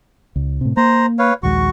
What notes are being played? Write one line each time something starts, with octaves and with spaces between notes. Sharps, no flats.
C#2
A2 C3
A#3 C5 A#5
B4 C#5 F5
A#1 D#2 G#3 F#4 C#6